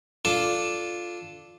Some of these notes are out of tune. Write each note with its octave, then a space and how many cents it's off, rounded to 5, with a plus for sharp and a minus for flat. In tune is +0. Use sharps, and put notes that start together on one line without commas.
D4 +0 F4 +0 A4 +0